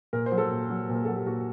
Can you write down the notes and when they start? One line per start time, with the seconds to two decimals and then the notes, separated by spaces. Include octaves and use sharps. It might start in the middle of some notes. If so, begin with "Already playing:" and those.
0.13 A#2 A#4
0.26 C5
0.32 F#3
0.38 A4
0.51 A#2
0.70 F#3
0.89 A#2
0.94 A#4
1.05 F#3 A4
1.16 G4
1.26 A#2 F#4